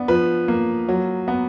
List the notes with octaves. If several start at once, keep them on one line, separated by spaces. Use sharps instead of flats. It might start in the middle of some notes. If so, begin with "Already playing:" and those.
Already playing: B3 D4
F3 B4
A#3
F#3
B3